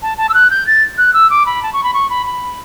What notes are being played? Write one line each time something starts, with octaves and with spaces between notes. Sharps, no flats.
A5
A5
E6
F#6
G6
A6
F#6
E6
D6
B5
A5
C#6
B5
C#6
B5
B5